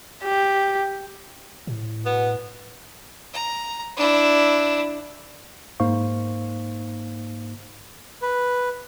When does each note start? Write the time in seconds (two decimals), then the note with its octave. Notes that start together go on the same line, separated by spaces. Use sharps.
0.24 G4
1.67 A2
2.04 B2 B3
3.33 A#5
3.97 D4 E4
5.80 G#2 A#3 D#4 C5 F5 C#6
8.22 B4